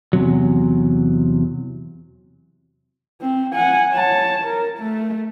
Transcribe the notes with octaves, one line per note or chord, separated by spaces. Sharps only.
E2 C3 F#3
C4
F#5 G#5
C#5 A5
A#4
A3